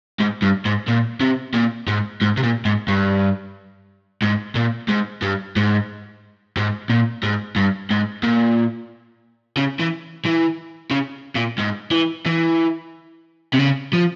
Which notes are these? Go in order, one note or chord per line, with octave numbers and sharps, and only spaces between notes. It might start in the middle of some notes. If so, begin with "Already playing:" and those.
G#2
G2
G#2
A#2
C3
A#2
G#2
G#2
C3
A#2
G#2
G2
G#2
A#2
G#2
G2
G#2
G#2
A#2
G#2
G2
G#2
A#2
C#3
E3
E3
C#3
A#2
G#2
E3
E3
C3
C#3
F3